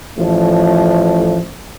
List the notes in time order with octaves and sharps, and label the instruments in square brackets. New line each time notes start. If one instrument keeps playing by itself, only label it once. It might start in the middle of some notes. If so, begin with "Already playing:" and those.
[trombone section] A1 F3 A3